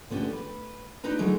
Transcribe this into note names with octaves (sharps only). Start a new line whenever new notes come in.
D3 B3 C#4 G4
B4
D4 D#4 B4 A#5
D3 F#3 G#3 D#4